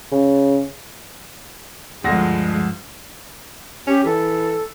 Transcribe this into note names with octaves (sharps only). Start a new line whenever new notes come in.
C#3
D2 G2 F3 G#3 A#6
C#4 G4
E3 A4